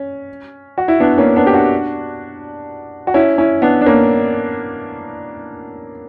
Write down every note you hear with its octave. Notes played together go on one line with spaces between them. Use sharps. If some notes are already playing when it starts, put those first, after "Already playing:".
Already playing: C#4
F#4
E4
B3 D4
A#3 C#4
B3 D4
G4
D4 F#4
F#4
C#4 E4
C#4 E4
B3 D4
D4
A#3 C#4